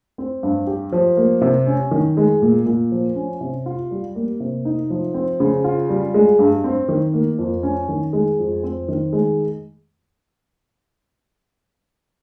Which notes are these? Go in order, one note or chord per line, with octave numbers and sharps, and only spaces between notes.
C4
G2
G4
F3
A#3
C3
C#4
D#3
G#3
A#2
A#2
F3
C#4
C3
F4
G3
A#3
C3
D#4
F3
C4
C#3
F4
G3
G#3
G2
C4
D#3
A#3
F2
C#4
D#3
G#3
F2
C4
D#3
G#3